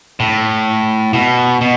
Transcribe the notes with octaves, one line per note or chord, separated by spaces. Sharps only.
A2
B2
B2